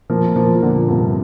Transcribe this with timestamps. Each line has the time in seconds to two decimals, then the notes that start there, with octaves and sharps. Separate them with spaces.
0.10 F3 A#3
0.36 F3 A#3
0.54 F3
0.63 A#2 D3
0.88 G2 C3